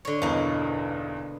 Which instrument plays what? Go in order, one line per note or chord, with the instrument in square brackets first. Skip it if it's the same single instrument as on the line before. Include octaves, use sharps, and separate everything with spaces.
[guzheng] D3 C#5
[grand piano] B1 E2 G2 [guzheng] B2 A#3